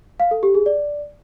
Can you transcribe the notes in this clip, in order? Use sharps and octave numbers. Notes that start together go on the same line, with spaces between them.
F5
A4
G4
G#4
D5